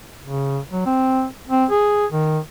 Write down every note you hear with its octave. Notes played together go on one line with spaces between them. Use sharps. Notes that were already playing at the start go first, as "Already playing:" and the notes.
C#3
F#3
C4
C4
G#4
D#3